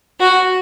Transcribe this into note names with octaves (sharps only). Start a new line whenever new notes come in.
F#4